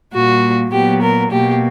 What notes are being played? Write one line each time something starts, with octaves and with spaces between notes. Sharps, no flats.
A#2 G3 A#3 F#4
A#2 F#3 B3 G4
A#4
B2 A#3 G4